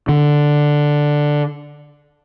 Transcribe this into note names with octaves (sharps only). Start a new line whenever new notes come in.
D3